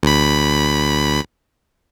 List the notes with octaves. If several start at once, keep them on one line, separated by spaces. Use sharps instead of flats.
D2 B5